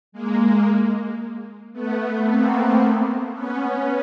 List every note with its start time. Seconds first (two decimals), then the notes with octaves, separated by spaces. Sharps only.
0.12 G#3 A#3
1.72 A3 B3
2.26 A#3 C4
3.33 B3 C#4